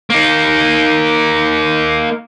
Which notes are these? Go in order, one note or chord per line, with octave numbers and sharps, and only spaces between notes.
A#3 D#4